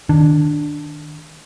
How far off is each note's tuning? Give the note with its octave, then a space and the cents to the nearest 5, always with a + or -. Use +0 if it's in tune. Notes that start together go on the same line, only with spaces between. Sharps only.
D#3 -20 D4 +0